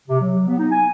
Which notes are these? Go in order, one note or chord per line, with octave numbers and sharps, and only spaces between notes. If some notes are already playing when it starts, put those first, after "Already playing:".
C3
F#3
B3
D#4
G#5